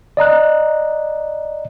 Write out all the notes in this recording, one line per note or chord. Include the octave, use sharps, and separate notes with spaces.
D5 D#5 A#5 F#6